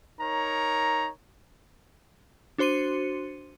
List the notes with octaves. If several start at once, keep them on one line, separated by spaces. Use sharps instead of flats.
D#4 A#4 C#5 A#5
D4 F#4 C5 C6 C#7 D#7